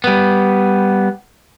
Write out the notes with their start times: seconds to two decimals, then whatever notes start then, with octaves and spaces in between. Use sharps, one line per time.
0.04 G3 B3